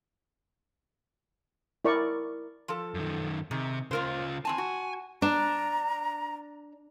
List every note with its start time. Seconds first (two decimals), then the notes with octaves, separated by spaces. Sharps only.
1.85 E4 A#4 D5 C#6
2.68 F3 A4
2.94 F#2 D#3
3.51 C3 D#3 G#4
3.91 A#2 C#3 F4 A#4 C5
4.45 E2 C4 G#5 A5
4.58 F#4
5.22 D4 A#5